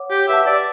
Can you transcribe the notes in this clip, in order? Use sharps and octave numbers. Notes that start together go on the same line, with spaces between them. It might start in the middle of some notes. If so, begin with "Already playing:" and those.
Already playing: C#5 F#5 D6
G4
B4 E5 F#5 A5
D5